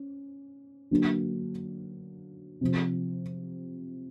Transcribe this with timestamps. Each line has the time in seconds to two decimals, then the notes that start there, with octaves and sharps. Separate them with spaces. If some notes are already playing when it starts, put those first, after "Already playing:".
Already playing: C#4
0.91 D3 F#3 A#3 D4
2.61 C3 F3